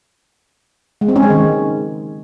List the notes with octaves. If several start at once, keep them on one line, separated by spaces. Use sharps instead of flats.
G#3
C4
C#4
G#3
D#3